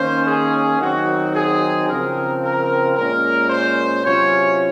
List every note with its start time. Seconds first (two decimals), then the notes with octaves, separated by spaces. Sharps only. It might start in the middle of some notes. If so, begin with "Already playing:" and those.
Already playing: D#3 A#3 C#4 C5
0.26 G#4
0.80 D#3 F#3 C4 D#4 F#4
1.34 G#4
1.88 C#3 F3 C4 A#4
2.41 A#4
2.96 A#2 G#3 C#4 A#4
3.50 C5
4.04 C3 F#3 C#4 F4 C#5